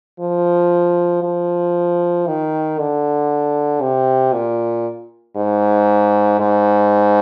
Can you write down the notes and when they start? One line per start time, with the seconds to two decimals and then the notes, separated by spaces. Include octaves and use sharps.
0.20 F3
1.23 F3
2.27 D#3
2.79 D3
3.81 C3
4.33 A#2
5.36 G#2
6.40 G#2